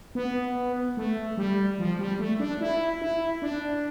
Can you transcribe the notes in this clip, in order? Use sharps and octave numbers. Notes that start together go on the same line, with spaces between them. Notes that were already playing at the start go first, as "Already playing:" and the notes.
B3
A3
G3
F3
G3
A3
D4
E4
E4
D4